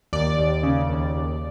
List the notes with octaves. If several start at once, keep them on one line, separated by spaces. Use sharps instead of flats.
D#2 D5
D#2
C#3
D#2
D#2